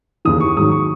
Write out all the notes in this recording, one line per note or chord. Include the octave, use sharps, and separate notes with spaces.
D#2 C#3 E3 D#6
C#6
G#2 D#3 F#3 D#6
C#6